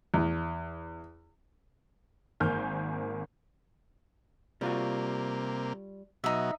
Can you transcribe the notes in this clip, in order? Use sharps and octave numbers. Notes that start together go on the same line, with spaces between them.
E2
G#1 A#3 C5 G#5 F6 G6
C3 G3 A#3 F4 F#4
B2 F#3 D#4 E5